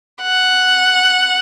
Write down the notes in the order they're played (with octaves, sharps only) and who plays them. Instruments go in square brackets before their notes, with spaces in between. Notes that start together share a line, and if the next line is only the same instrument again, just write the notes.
[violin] F#5